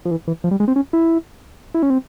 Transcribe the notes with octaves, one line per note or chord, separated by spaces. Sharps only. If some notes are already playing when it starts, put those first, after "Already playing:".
F3
E3
E3
F3
G3
G#3
C4
C#4
E4
E4
C#4
C4